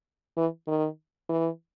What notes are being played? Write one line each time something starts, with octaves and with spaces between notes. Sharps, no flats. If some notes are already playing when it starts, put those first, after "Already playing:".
E3
D#3
E3